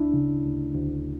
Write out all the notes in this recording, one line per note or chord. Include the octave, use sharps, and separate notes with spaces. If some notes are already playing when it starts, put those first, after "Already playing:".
Already playing: D2 D4 E4
C#3
D2
D2